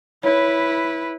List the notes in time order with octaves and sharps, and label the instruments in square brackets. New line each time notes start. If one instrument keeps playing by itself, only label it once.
[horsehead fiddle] E4 B4 [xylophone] C#5